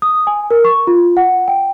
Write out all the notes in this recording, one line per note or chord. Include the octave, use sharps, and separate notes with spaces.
D#6
G#5
A#4
C#6
F4
F#5
G5